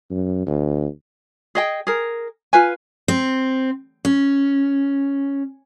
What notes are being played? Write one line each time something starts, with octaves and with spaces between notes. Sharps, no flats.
F#2
D2
G#4 D#5 G5
G#4 A#4
F4 B4 G#5
C4
C#4